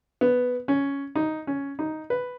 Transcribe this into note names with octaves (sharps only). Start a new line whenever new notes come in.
B3
C#4
D#4
C#4
D#4
B4